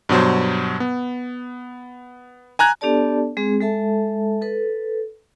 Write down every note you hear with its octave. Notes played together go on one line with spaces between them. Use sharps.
G2 B2 F#3 C5
B3
G#5 A#5 F#6 G#6
B3 D4 G4 A4 D5 A5
G#3 C4 G#4
G#3 A4 E5 A5
A4 B4